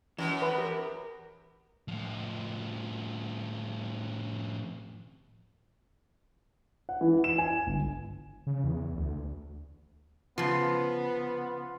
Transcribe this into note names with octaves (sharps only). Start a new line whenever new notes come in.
F#2 E3
B4
G4 A#4
A2 F3
F#5
E3
E7
G#5
G1
C#3
E2
D2
C#3 F3 B3 F4